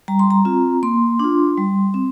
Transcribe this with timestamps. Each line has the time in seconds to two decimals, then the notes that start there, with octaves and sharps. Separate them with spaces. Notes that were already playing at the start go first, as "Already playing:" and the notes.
0.08 G3 A#5
0.19 C6
0.30 A#5
0.45 C4 F4
0.83 A#3 C6
1.20 D4 F4
1.57 G3
1.94 C4